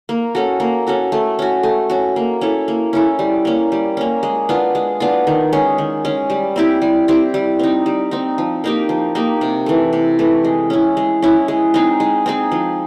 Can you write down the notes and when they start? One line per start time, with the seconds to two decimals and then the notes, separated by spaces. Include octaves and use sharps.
0.09 A#3
0.35 C#4 F#4 A4
0.60 A#3
0.87 C#4 F#4 A4
1.12 A3
1.39 C#4 F#4
1.63 A3
1.90 C#4 F#4
2.16 A#3
2.41 C#4 E4 A4
2.68 A#3
2.93 C#4 E4 A4
3.19 G3
3.45 A#3 C#4
3.72 G3
3.97 A#3 C#4
4.23 G#3
4.49 B3 D4 F4
4.75 G#3
5.00 B3 D4 F4
5.27 D#3
5.53 G#3 C#4
5.78 D#3
6.05 G#3 C#4
6.30 G3
6.56 C4 E4 G4
6.82 G3
7.08 C4 E4 G4
7.34 G3
7.59 C4 D#4
7.86 G3
8.11 C4 D#4
8.38 F3
8.64 A#3 D#4 G4
8.89 F3
9.15 A#3 D#4 G4
9.41 C3
9.66 E3 A3
9.93 C3
10.19 E3 A3
10.44 G#3
10.70 C#4 E4
10.97 G#3
11.22 C#4 E4
11.48 G#3
11.74 C4 D#4 G#4
12.00 G#3
12.26 C4 D#4 G#4
12.52 F3